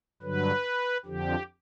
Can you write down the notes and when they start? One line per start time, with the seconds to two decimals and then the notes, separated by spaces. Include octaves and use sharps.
0.22 G2 D3 F#3 B4
1.06 F2 D3 F3 G4